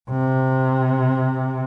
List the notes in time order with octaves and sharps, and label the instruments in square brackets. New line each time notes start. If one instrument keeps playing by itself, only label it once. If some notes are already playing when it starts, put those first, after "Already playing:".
[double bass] C3